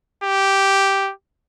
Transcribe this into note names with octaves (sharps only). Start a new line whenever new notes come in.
G4